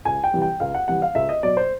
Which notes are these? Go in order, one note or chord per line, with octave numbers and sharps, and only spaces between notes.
C#2 G#5
G5
C3 E3 G3
G5
C#2 F5
F#5
C3 E3 G3 F#5
F5
C#2 E5
D#5
B2 F#3 D5
C5